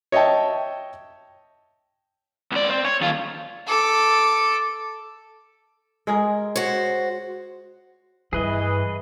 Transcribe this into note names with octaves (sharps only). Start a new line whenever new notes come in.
C#5 D#5 E5 G5 A5
C#2 D5
C4
C#5
D#2 F4
A4 D6
G#3 G#4 A#4
F#4 C5 C#5
G2 E3 G#4 B4 D#5